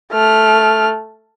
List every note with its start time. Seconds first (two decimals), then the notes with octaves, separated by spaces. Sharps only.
0.12 A3 F6